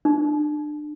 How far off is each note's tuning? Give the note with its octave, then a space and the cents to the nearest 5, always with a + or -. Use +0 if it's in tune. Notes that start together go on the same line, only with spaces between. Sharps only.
D4 +30